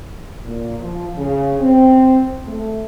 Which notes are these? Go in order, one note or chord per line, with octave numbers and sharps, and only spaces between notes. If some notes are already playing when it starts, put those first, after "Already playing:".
A#2
F3
C#3
C4
A3